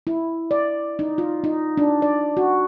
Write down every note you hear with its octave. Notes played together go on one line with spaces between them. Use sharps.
E4
D5
D#4
F4
D#4
D4
D5
F#4